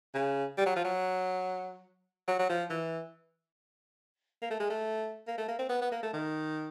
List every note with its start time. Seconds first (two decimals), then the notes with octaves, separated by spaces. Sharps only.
0.14 C#3
0.57 G3
0.66 F#3
0.76 F3
0.85 F#3
2.28 F#3
2.39 F#3
2.50 F3
2.70 E3
4.42 A#3
4.50 A3
4.60 G#3
4.70 A3
5.27 A#3
5.38 A3
5.48 A#3
5.59 C4
5.70 B3
5.81 B3
5.91 A#3
6.03 A3
6.14 D#3